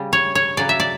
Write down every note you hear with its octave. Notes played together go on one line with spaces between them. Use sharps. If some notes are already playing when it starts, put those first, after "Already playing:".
Already playing: C#3 G3
C#5
C#5
C#3 F#3 D5
E5
D5